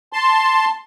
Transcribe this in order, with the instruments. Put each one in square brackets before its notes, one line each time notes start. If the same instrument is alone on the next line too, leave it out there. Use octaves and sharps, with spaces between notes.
[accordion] A5 C6